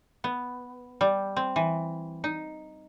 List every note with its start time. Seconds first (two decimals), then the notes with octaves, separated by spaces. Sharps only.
0.24 B3
1.01 G3
1.36 C4
1.56 E3
2.24 D#4